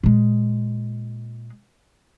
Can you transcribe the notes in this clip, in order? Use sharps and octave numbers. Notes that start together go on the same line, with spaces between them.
A#2 G#3